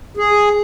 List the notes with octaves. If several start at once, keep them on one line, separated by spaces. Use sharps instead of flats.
G#4